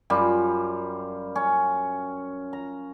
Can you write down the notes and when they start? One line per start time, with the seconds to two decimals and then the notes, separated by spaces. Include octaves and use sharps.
0.10 F#2 G3 F4
1.36 C#4
2.53 A#5